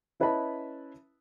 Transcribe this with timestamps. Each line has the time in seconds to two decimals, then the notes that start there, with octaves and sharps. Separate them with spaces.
0.20 C#4 E4 B4 D#5 A5 B5